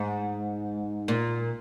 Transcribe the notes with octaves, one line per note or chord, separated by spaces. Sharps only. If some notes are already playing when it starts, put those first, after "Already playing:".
Already playing: G#2
A#2